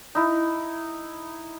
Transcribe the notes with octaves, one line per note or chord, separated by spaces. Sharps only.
D#4 E4